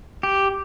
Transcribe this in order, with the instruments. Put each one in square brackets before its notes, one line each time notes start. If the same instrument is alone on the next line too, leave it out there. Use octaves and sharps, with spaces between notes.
[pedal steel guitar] G4